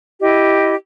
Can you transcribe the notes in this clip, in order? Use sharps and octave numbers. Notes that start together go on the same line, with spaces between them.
E4 G4 D#5